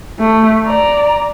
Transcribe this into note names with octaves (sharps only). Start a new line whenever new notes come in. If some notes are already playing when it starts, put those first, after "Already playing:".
A3
D5 A#5